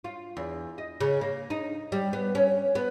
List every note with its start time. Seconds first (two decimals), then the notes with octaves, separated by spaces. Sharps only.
0.04 F4
0.37 E2
0.78 D#5
1.01 C#3
1.21 A#3
1.50 D#4
1.92 G3
2.13 B3
2.35 C#4
2.75 B3